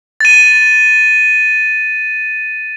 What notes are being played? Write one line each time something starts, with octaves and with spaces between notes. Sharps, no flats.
A6 D#7